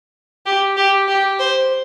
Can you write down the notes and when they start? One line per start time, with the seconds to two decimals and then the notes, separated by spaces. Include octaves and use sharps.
0.46 G4
0.77 G4
1.08 G4
1.39 C5